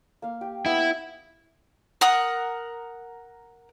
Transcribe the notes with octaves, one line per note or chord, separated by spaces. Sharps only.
A#3 F5
G4
B3 E4
A#4 F#5 D#6